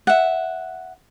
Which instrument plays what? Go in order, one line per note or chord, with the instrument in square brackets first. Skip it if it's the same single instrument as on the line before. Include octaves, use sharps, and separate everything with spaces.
[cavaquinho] E5 F#5